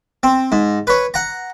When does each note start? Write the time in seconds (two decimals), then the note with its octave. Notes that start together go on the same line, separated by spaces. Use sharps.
0.23 C4
0.52 G#2
0.87 B4 C#5
1.14 F#5 A#5